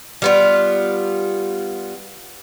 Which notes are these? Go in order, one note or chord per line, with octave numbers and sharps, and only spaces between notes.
G3 B3 F4